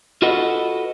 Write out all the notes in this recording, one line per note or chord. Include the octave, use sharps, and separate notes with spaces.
F4 F#4 A4 B4 D#5 F#5